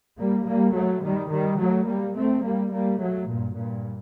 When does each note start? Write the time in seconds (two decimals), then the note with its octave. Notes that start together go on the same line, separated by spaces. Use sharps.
0.18 G3 A#3
0.46 G3 A#3
0.75 F#3 A3
1.03 D#3 G3
1.31 D#3 G3
1.59 F#3 A3
1.87 G3 A#3
2.16 A3 C4
2.44 G3 A#3
2.72 G3 A#3
3.00 F#3 A3
3.29 G2 A#2
3.57 G2 A#2